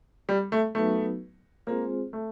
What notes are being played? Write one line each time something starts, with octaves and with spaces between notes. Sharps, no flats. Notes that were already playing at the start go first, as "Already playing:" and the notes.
G3
A3
F#3 A3 B3 D#4 F#4 B4
G#3 A#3 C4 F4 G#4 C5
A3